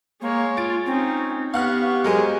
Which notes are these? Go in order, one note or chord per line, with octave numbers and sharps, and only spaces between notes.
G#3 A#3 C#5
F4 A6 D7
C4 C#4 D#4
B3 G4 F5 F#5 C#6 F6
F#3 G#3 A#4 C5